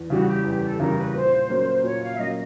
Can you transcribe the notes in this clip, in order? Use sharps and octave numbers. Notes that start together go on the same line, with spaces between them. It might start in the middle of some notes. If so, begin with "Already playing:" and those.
Already playing: E2
C#3 E3 G3 F#4
G4
E2 G4
A#4
A4
C#3 E3 G3 A#4
B4
A#2 C5
F#3 A#3 C#4
A#2 C#5
F5
E5
F#3 A#3 C#4 D#5